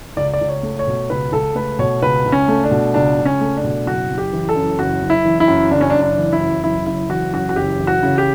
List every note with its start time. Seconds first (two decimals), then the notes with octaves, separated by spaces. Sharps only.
0.17 C#2 D5
0.33 D5
0.41 C#2
0.48 C#5
0.63 A3
0.79 C#5
0.87 B2
1.10 C#2 B4
1.32 C#2 A4
1.55 A3 B4
1.79 B2 C#5
2.02 C#2 B4
2.26 C#2
2.32 C#4
2.48 A3
2.64 D4
2.71 B2
2.94 C#2 D4
3.18 C#2
3.25 C#4
3.41 A3
3.57 D4
3.64 B2
3.86 F#1 F#4
4.10 F#1
4.18 G4
4.33 E3
4.49 A4
4.56 F#2
4.79 F#1 F#4
5.02 F#1
5.10 E4
5.25 E3
5.40 E4
5.48 F#2
5.71 F#1 D4
5.81 C#4
5.90 D4
5.95 F#1
6.03 D4
6.17 E3
6.33 E4
6.40 F#2
6.64 F#1 E4
6.87 F#1 E4
7.10 E3 F#4
7.33 F#2 F#4
7.49 F#4
7.56 F#1 G4
7.79 E3
7.87 F#4
8.03 C#3
8.18 G4